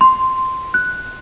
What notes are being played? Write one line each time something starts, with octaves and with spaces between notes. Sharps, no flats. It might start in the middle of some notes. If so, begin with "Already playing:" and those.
C6
F#6